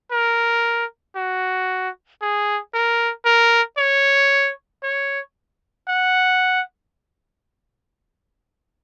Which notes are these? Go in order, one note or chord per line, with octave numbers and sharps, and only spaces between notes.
A#4
F#4
G#4
A#4
A#4
C#5
C#5
F#5